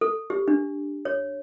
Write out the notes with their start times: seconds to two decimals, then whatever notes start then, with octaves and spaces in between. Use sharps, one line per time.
0.01 A4
0.30 G4
0.48 D4
1.05 C#5